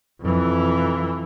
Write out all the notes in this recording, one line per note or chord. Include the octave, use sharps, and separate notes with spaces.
F2 E3